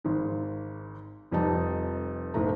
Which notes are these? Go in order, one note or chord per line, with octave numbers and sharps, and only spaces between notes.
G#1 G#2
F1 F2 G3 C4 D#4 A5
F#1 B1 A3 A#5